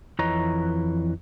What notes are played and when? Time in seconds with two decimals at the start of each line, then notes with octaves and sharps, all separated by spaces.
0.19 F2 E3 B4 C#5 D#5 A#5